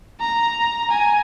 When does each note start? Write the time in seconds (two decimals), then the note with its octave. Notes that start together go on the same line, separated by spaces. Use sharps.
0.20 A#5
0.91 G#5